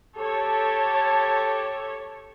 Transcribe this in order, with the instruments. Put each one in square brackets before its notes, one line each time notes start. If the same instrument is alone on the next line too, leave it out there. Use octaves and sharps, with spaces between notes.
[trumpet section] G4 A5 [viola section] A4 C#5